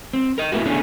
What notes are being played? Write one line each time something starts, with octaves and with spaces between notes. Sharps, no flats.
C4
A#4 D#5
A#3 B3 E4 F#4
A3 B3 C#4 D4 G#4